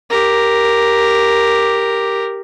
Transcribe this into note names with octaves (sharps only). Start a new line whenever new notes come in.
G4 A#4